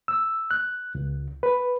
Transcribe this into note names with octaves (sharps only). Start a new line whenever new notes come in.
E6
F#6
C#2
B4